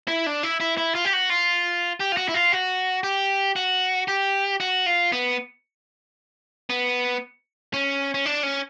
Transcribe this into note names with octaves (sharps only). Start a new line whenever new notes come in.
E4
D4
E4
E4
E4
F4
G4
F#4
F4
G4
F4
F#4
E4
F4
F#4
G4
F#4
G4
F#4
F4
B3
B3
C#4
C#4
D4
C#4